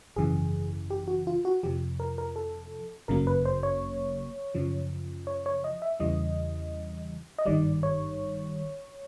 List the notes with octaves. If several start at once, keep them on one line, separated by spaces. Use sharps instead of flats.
G#1 F#2 C#3 E3 G#4
G4
F#4
F4
F#4
F2 C3 F3 G4
A#4
A#4
A4
G1 F#2 C#3 F#3 A#3 A#4
B4
C5
C#5
F#2 C#3 F3
C#5
C#5
D#5
E5
E2 C#3 E3 G3 D#5
D#5
G#1 G2 D#3 G3 D5
C#5